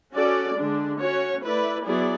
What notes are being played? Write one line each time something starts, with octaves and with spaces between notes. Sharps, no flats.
C#4 F#4 A4 D5
D3 G#3 D4
C#4 F#4 C#5
A3 E4 B4 D5
F#3 B3 E4 G#4 D5